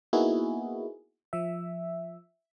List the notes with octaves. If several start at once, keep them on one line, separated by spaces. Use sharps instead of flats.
A#3 B3 D#4 E4 F#4 G#4
F3 E5